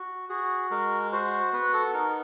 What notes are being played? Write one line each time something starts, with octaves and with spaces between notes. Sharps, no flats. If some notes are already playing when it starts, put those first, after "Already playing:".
Already playing: F#4
F#4 G#4
G#3 A#4
F#4 C5
B3 B4
A4
D#4 A#4